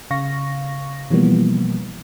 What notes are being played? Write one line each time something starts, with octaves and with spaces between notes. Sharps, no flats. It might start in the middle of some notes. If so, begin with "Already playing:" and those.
C#3 F5 C#6 A#6
B2 E3 F3 G3 A#3 B3